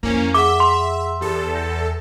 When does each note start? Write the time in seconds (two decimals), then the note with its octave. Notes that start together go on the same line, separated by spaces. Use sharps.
0.03 F2 A#3 C#4 E4 A#4 C5
0.34 G#4 E5 F#5 D6
0.60 C6
1.21 E2 G4 A4
1.55 E6 G6 A#6